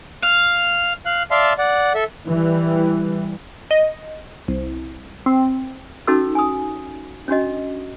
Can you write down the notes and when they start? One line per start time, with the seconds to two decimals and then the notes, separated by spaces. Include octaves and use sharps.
0.23 F5
1.06 F5 F#6
1.31 D5 E5 F5 A5 C6
1.58 D5 F#5
1.95 A4 E5
2.29 E3 G3
3.71 D#5
4.48 C2
5.26 C4
6.07 C#4 D#4 F#4 A4 D6 E6
6.35 G#5 D#6
7.28 C#4 D4 F#4 D#5